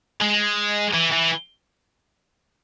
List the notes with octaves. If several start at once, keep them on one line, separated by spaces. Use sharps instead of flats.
G#3
E3
E3